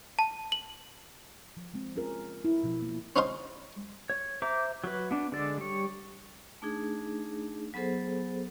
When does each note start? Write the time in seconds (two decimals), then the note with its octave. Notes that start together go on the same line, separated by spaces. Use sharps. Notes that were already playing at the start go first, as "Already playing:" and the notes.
0.19 A5
0.52 F#7
1.57 F3
1.74 G#3 C4
1.96 C#4 F4 G#4 A#4
2.45 E4
2.63 B2 F3
2.82 A#3
3.16 C4 C#4 D#4 F5 C6
4.10 C#5
4.42 C5 E5 A#5 D6
4.84 F#3 B4
5.11 B3 D4
5.32 D3 G#3 A4 D5
5.58 G3 C#5
6.62 A3 D4 D#4 G#4
7.74 F#3 B3 G#4 A4 C5